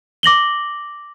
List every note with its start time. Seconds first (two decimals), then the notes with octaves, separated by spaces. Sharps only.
0.23 D6 A#6 F#7 G7